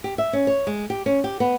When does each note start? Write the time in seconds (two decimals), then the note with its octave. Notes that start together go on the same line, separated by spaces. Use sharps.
0.04 G4
0.18 E5
0.33 C#4
0.47 C#5
0.67 G#3
0.90 G4
1.06 C#4
1.24 G4
1.40 B3